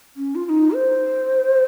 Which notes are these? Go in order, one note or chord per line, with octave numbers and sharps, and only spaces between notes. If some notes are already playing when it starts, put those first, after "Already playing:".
C#4
F4
F4
D#4
C5